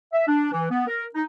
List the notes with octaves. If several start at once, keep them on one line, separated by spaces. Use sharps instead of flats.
E5
D4
E3
B3
A#4
D#4